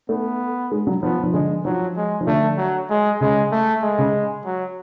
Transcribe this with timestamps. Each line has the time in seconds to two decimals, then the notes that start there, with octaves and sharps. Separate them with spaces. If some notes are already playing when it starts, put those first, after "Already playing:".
0.09 A3 B3
0.72 G#3
0.87 F#3
1.02 F3 B3
1.23 F3
1.33 D3 G#3
1.65 F3 F#3
1.96 G#3
2.21 F3
2.27 D3 A3
2.57 F#3
2.89 G#3
3.21 C#3 G#3
3.52 A3
3.82 G#3
3.98 C#3
4.45 F#3